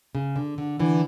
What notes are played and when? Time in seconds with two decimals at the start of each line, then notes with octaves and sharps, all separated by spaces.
0.15 C#3
0.36 D3
0.58 D3
0.79 D3 E3